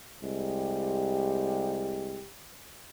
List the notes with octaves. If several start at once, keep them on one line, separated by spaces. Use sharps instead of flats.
C2 G#3 G4